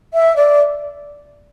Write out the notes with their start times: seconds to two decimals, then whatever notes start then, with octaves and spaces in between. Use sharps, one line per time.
0.13 E5
0.35 D5